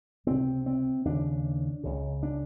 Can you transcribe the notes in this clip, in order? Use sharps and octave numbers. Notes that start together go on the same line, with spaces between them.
C#2 C3 C4
C4
D#2 C#3 D4
C#2 C#3
D4